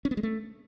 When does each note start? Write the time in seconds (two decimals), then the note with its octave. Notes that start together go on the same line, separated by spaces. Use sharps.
0.05 C#4
0.11 B3
0.17 G#3
0.23 A3